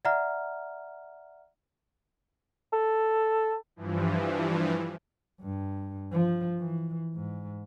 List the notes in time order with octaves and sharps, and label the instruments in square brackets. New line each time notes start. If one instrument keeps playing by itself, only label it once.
[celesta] D5 E5 F#5 A#5 F6
[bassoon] A4
[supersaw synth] G2 E3 F3
[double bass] G2
F3
E3
G#2